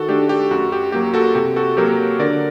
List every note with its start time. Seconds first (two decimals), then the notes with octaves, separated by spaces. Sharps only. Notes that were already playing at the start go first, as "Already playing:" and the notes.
Already playing: D#3 F#4 A4
0.09 A3 D4 G4
0.29 G4
0.51 F#2 F#4
0.72 G4
0.92 F#3 A#3 G4
1.14 F#4 A4
1.35 C3 G4
1.56 F#4 A4
1.77 F#3 A#3 G4 A#4
2.19 D3 A#4 D5